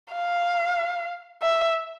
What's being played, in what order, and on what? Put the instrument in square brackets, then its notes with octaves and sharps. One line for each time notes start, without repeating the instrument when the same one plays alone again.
[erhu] F5
E5